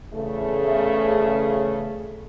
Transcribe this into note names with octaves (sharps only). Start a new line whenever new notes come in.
E2 C#3 A3